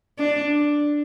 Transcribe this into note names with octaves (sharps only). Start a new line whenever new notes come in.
D4